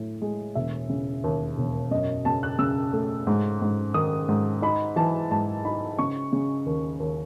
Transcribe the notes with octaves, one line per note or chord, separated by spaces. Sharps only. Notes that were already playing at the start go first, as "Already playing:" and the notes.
Already playing: A2
G#3
E1 E5
C#3
D#2
E1
F#2 D#5
C#3 A5
F#6
C#3 E6
A3
G#2
G#2
D#3 D#6
G#2
D#4 B5
E3 A5
G#2 A5
D#4 B5
C#3 C#6
C#3
D#2
D#2